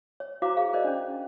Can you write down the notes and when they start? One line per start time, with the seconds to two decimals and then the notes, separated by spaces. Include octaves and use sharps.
0.20 C#5
0.42 E4 F#4 C5 F5 A#5 D6
0.57 G#4 F5
0.73 A#4 C5 D5 D#5
0.84 C#4 D4